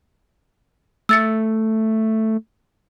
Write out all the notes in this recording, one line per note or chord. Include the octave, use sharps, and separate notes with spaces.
A3 E6 A6 C#7